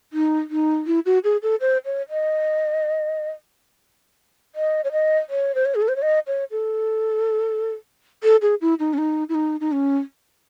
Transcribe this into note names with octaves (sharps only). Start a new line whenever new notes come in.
D#4
D#4
E4
F#4
G#4
A4
C5
C#5
D#5
D#5
C#5
D#5
C#5
C5
C#5
G#4
A4
C5
C#5
D#5
C#5
A4
A4
G#4
E4
D#4
C#4
D#4
E4
D#4
D#4
C#4